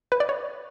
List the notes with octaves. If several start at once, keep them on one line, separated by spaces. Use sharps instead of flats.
B4
D5
C#5